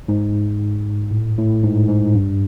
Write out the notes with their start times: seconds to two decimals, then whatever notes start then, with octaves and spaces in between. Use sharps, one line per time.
0.08 G#2
1.11 A2
1.38 A2
1.63 G#2
1.88 G#2
2.15 G2